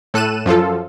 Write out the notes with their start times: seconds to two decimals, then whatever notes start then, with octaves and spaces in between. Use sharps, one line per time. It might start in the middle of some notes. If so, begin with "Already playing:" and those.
0.14 A2 A4 F#6 D#7 E7
0.46 F#2 F3 F4 A4